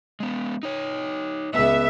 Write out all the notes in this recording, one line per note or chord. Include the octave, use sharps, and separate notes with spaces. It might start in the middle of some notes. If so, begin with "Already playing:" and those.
G#3 B3
D#4 C#5
C#2 B3 E5